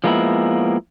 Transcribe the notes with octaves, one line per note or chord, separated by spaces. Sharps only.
F3 G#3 A#3 B3 D4 E4